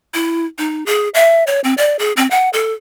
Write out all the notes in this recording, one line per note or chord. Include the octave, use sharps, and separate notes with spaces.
E4
D#4
G#4
E5
C#5
C4
D5
G#4
C4
F#5
A4